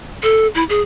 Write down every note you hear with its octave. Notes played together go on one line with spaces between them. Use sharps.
A4
E4
G#4